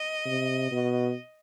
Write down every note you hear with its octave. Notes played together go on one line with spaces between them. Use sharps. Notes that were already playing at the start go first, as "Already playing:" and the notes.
Already playing: D#5
C3
B2